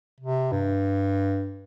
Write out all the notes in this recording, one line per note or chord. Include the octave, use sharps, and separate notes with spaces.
C3
G2